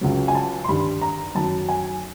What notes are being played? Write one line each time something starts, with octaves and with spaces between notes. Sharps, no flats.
C#2 C#3 F#3
G#5
A5
C6
G2 D#3 G3 B5
A#5
F#2 D#3 F#3 A5
G#5